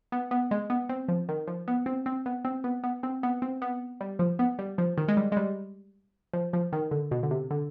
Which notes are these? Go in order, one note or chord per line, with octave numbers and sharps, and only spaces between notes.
B3
B3
G#3
B3
C4
F3
D#3
F3
B3
C4
C4
B3
C4
B3
B3
C4
B3
C4
B3
G3
F3
B3
G3
F3
D#3
G#3
G3
G#3
G3
F3
F3
D#3
D3
B2
D3
C3
D3